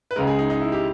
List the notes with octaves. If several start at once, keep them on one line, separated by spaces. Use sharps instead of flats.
B4
C#2 C#3 G#3 A#4
G#4
D#4
D#4
E4
G4